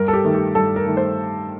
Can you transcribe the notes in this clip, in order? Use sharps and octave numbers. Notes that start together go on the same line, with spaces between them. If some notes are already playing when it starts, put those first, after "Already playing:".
Already playing: G2 A#4
A4
G4
D#3 A3
G4
G2 A4
A#4
D#3 A3
C5